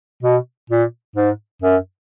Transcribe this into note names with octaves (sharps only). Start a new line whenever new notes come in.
B2
A#2
G#2
F#2